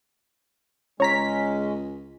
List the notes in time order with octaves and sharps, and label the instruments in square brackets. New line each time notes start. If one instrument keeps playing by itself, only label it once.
[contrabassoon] C#2 [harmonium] G#3 C#4 [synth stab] C#5 A#5 B6